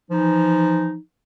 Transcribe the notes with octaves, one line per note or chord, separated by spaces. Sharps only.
E3 F3 D#4